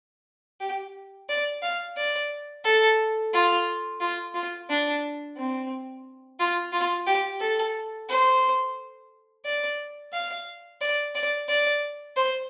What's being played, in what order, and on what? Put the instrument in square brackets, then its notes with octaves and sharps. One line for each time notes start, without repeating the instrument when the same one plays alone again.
[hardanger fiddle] G4
D5
F5
D5
A4
F4
F4
F4
D4
C4
F4
F4
G4
A4
C5
D5
F5
D5
D5
D5
C5